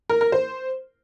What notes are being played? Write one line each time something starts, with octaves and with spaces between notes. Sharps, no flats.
A#4
A#4
C5